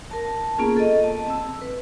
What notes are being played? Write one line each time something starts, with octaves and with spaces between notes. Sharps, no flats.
A#4 A5
A#3 B3 C#4 F4 G#4
A4 D#5
A5
C4 E6
B4